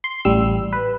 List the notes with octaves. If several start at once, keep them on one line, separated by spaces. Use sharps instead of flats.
C6
A1 G3 E6
B4